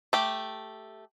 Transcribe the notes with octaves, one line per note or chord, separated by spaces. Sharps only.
A3 G4